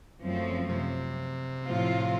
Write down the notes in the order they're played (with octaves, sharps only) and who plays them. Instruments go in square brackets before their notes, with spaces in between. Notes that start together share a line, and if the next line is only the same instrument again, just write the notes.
[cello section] F#2 F3 A3 C4
[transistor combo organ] C3
[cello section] A2 F3 C4 F4